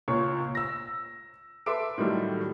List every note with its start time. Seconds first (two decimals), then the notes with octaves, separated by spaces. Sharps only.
0.08 C#2 A#2 C#5 C#6
0.55 E6 A#6
1.66 A4 B4 E5 C6 D6 D7
1.98 A2 D#3 F#3 G3 A3